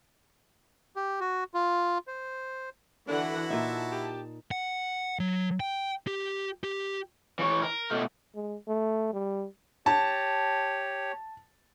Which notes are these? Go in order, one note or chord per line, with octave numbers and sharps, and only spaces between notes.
G4
F#4
F4
C5
D3 E3 D4 E4 F#4 F#5
A#2 D#4 E5 A5
G4
F#5
F#3
G5
G4
G4
E3 C#5
A#4
B2 A3
G#3
A3
G3
G4 C#5 A5